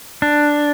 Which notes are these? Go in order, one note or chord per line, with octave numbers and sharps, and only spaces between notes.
D4